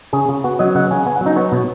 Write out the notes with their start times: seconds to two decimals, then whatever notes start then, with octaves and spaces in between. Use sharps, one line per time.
0.13 C#3 G#4
0.29 C#3
0.44 B3 F#4
0.59 F#3 D#5
0.75 C#3 F#5
0.91 C#3 G#5
1.06 B3 G#5
1.16 F#3 F#5
1.26 D#4
1.36 B3 C#5
1.52 B2